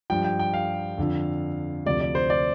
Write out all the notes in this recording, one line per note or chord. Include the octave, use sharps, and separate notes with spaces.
G2 F3 G5
G5
G5
F5
F2 D3 F3
D2 C3 F3 D5
D5
C5
D5